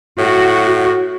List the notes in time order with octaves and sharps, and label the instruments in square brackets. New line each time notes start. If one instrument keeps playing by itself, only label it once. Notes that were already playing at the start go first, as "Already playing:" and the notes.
[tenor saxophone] A2 [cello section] F#4